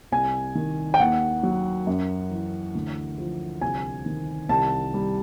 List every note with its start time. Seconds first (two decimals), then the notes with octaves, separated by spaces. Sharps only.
0.12 C2 G#5
0.55 D#3
0.94 G5
1.00 D#2 F#5
1.43 F#3
1.87 F#2
2.31 E3
2.75 D2
3.18 F3
3.61 C2 G#5
4.06 D#3
4.49 C2 A5
4.94 G3